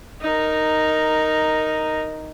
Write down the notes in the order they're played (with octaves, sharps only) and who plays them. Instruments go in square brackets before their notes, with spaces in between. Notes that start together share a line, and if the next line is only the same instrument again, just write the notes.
[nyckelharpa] D#4 A#4